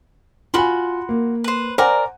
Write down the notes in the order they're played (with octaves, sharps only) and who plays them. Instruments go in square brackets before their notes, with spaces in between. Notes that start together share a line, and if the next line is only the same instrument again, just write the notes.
[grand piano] F4 G#5 [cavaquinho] F#4 B5 C6
[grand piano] A#3
[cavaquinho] B4 C5
[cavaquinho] A#4 D5 A#5 [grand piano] C5 F#5 G#5